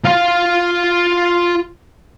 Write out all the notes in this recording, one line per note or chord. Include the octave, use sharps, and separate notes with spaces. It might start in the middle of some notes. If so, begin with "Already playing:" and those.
F4 F5